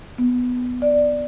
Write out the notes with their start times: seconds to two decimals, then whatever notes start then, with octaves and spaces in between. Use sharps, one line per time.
0.18 B3
0.82 D5